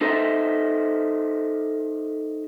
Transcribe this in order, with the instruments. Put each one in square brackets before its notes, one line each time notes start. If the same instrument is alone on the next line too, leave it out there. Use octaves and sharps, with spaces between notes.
[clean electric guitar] D#4 A4 C5 D#5 E5 A#5